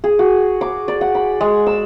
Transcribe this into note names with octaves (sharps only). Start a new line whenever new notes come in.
G#4
F#4
D6
D5
F#5
B5
G#3
E6